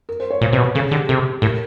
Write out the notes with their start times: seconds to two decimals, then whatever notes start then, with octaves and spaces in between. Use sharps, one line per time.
0.09 A#4
0.20 C5
0.30 C#5
0.41 A#2 C5
0.53 C3 B4
0.58 B2
0.64 B4
0.75 C#3 A4
0.83 G#4
0.91 D3 G4
1.09 C3 A4
1.42 A2 A#4